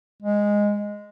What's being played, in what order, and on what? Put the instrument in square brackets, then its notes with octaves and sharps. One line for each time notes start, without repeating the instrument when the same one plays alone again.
[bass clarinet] G#3